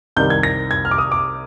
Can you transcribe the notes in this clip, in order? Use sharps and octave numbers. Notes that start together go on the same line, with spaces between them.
C2 C3 D#3 G3 G6
G#6
A#6
G#6
F6
D6
D#6
D6